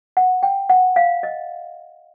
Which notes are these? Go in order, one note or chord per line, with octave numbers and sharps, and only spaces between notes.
F#5
G5
F#5
F5
D#5